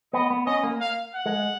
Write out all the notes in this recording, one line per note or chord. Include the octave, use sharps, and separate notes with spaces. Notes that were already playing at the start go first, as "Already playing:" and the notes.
B3 D#5
B3
C#4 D#5
A#3
F5
F#5
G#3